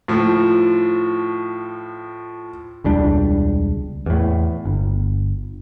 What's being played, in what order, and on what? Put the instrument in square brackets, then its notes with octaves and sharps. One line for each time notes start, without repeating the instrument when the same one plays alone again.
[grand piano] A2 F3
[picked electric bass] E1 C#2 G3 D4
E2 A2
G1